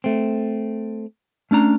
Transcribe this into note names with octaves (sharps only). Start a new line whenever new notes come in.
A3 C4
A3 C#4 D4 A#5